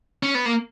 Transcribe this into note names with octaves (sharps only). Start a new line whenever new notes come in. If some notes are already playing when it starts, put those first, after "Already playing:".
C#4
B3
A#3